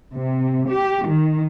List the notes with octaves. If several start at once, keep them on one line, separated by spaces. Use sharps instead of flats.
C3
G4
D#3